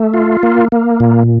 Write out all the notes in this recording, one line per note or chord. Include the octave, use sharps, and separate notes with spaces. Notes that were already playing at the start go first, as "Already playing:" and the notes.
Already playing: A3
F4
A#3
A#3
A#2